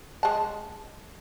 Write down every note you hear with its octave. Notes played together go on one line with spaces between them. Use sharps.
G#3 A5